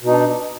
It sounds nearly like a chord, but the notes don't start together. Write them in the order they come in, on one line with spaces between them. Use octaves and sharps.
B2 D#4 D4